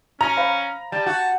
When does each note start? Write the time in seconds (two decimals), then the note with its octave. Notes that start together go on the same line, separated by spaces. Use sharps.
0.21 C#4 A#5
0.37 C5 F5 B5
0.92 G3 A5
1.06 F#4